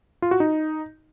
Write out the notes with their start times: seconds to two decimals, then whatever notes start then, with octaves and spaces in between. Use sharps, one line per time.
0.22 F4
0.31 F#4
0.40 D#4